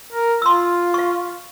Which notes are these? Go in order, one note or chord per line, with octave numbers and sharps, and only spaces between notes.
A#4
F4 C6 E6
F5 C#6